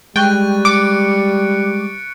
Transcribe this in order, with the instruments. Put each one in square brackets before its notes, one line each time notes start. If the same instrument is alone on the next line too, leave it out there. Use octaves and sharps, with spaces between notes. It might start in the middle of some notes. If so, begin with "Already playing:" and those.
[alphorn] G3 [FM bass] G#3 [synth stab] G5 [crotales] C#6 F#6 A6
[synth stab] D6 [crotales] C#7 D7